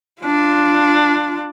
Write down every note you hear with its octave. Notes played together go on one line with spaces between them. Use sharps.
D4 F4